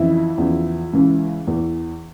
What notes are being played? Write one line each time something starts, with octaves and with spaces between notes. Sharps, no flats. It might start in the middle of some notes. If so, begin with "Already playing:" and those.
Already playing: F2 C#3 E3 E4
E2 C#3 F3
C#2 C#3 E3
E2 E3